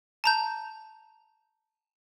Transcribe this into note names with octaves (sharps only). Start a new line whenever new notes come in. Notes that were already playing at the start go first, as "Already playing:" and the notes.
A5 A#5 G6